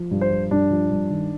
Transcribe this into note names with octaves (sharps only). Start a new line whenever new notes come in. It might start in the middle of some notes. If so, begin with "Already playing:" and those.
Already playing: F3
G2
C5
F3
G2 D4
F3
G2
D#3